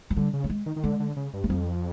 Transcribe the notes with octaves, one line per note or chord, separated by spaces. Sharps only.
F#3
D3 G3
C#3
A3
G#3
D#3
D#3
D3 G#3
D3
C#3
G2
G3
F2 F#3